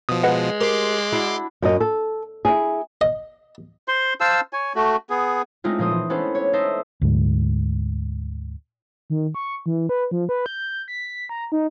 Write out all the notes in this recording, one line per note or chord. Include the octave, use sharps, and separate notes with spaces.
B2 F3 D#6
G#3 B4 D#5 F#5
G4 A#4 C5 C6 D6
D4 E4 F#4
F#2 D#5
A4
E4 G#4
D#5
C5 C6
C5 F5 A5 E6
C#5 G#5
A3 F#4
B3 G#4
G#3 A3 C4 D4 D#4 F4
A#2 F3 C5 D#6
E3
B3 C#4 D4 A4 B4 C5
C#5
D#4 A4 C5 D#5 E5
D2 G#2
D#3
C#6
E3
B4
F3
B4
G6
B6
A#5
D#4